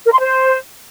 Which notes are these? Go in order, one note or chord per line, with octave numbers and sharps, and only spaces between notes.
A#4
C6
C5